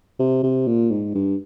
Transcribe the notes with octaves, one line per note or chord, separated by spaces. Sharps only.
C3
C3
A#2
G#2
G2